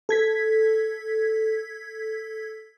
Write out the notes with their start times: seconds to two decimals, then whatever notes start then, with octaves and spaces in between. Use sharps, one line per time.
0.09 A4 G#6 B6